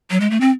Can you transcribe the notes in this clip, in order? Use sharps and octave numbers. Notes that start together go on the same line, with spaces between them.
F#3
G#3
A3
C4